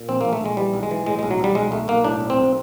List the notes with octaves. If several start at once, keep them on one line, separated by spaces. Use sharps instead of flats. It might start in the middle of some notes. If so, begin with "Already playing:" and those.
Already playing: A#2
A#1 C4
A#1 A#3
A3
A#1 G#3
E3 G3
B1
G#3
E3
A2 G#3
B1 G#3
F#3
B1 G3
B1 G#3
B1 A3
B1 A#3
A2 D4
B1
C4
B1